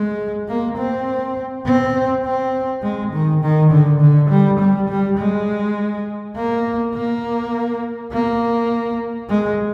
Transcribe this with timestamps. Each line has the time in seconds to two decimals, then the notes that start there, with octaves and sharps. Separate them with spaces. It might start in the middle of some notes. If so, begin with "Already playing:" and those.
Already playing: G#3
0.48 A#3
0.78 C4
1.66 C4
2.25 C4
2.83 G#3
3.13 D#3
3.42 D#3
3.71 D3
4.01 D3
4.30 G3
4.59 G3
4.89 G3
5.18 G#3
6.36 A#3
6.94 A#3
8.12 A#3
9.30 G#3